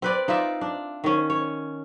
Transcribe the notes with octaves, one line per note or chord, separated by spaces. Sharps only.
C4 B4 D5
D#4 F4 D5 E5
D4
D#3 C#4
C#5